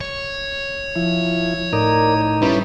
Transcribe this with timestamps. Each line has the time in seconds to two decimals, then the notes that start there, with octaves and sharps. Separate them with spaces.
0.01 C#5
0.96 F3 E4
1.73 A2 D#4 A#4 D5
2.42 G3 C#4 E4 B4